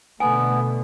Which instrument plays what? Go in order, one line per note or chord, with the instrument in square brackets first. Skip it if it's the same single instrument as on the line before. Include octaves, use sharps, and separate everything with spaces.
[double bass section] B2 D3 A3 [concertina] B3 [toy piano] G#5